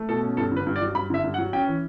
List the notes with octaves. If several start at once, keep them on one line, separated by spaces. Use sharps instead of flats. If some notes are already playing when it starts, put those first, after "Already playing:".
Already playing: A3
B2 A4
C#4
G2 A4
D3 B4
G2
D5
F#3
G2 B5
D3 E5
G2
F#5
F#3
C#4 G5
E3